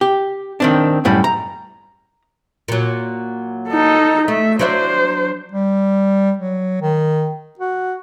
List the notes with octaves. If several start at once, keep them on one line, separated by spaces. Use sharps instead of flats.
G4
D#3 C4 D4
F#2 A2 G3
A#5
A#2 F#3
D#4 A4
A3 E5
F#3 D4 C5 E5
G3
F#3
D#3
F#4